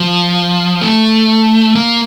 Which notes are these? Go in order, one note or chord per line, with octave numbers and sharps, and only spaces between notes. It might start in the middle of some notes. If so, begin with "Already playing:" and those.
Already playing: F3
A3
A#3